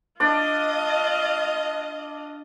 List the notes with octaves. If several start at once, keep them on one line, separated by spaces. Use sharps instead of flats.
D4 F4 D5 D#5